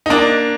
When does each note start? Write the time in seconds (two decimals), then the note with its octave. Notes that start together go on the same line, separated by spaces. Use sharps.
0.06 D#4
0.10 A#3 D4